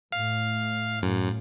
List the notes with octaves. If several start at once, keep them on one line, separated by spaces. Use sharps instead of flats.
A2 F5
F#2 A2